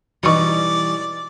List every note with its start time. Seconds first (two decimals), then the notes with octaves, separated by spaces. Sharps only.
0.23 B2 E3 G3 D#4 D5 C#6